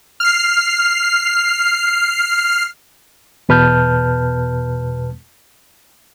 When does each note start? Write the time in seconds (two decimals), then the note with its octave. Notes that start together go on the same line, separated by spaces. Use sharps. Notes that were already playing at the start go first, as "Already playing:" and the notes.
0.20 F6 C7
3.49 E2 B2 B4 A5 F6 G6